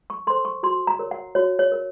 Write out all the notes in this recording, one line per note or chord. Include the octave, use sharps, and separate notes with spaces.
C#6
A4 C5 C6
C#6
F#4 C6
A#5
A#4 C#5
F#5
F#4 C#5
C#5
A#4 C#5